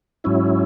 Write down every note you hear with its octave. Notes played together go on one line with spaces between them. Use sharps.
G#2 F#3 C#4 E4